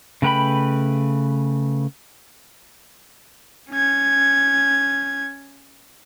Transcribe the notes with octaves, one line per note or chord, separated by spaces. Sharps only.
C#3 A3 B4 G5 B5
C#4 G#6